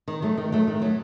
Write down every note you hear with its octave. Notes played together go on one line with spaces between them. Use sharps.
D#3
F#3 A3
D#3
F#3 A3
D#3
F#3 A3